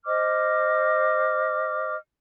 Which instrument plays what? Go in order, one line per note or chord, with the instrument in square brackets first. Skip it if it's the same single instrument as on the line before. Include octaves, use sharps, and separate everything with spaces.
[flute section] C5 D#5 D6 F6